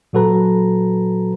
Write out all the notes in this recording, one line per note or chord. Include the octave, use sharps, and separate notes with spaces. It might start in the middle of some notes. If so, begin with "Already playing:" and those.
A#2 F#3 F#4 A4 B4 A#5